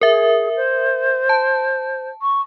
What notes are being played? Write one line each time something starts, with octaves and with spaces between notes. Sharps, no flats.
G#4 A#4 E5
C5
A5
C#6